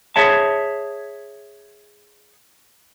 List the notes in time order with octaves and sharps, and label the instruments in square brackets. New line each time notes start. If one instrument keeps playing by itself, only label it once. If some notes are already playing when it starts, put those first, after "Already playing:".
[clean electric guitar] G#4 C#5 E5 A5